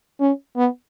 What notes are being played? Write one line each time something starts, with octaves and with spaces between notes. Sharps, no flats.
C#4
B3